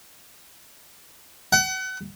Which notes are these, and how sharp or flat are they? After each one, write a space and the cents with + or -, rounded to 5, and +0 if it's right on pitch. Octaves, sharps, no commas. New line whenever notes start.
F#5 +35